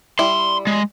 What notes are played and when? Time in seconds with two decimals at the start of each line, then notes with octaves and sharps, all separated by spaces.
0.19 G3 E4 C6
0.67 G#3